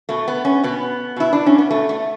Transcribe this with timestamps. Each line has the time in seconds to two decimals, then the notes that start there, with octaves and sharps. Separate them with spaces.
0.09 B2 A3
0.28 B3
0.45 C#4
0.64 B2 B3
1.16 B2 E4
1.33 D4
1.46 C#4
1.58 B3
1.71 B2 A3
1.89 A3